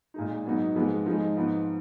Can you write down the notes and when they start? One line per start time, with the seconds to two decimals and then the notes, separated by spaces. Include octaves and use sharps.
0.14 A#2 G#3 D#4
0.45 G#2 F#3 B3 D#4
0.75 G#2 F3 G#3 B3
1.06 G#2 F3 G#3 D#4
1.37 G#2 F3 B3 D#4